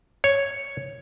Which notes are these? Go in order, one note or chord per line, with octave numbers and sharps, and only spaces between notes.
C#5